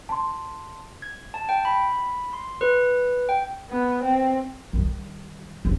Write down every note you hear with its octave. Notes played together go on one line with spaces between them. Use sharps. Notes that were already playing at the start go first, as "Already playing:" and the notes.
A5 C6
G#6
A5
G5
B5
C6
B4
G5
B3
C4
D#3 G3
C#2 F3